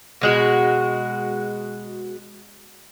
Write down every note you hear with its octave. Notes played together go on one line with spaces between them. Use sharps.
B2 G#3 F#4